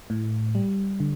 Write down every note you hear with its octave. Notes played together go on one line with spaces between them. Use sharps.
A2
G3
D3